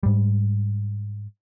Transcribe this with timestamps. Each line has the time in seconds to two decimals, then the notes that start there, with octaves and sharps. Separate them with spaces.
0.03 G#2 G3